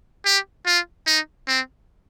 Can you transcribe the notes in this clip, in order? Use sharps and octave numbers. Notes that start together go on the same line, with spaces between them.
G4
F4
D#4
C4